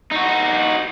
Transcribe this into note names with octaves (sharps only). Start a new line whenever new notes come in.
D#4 F#4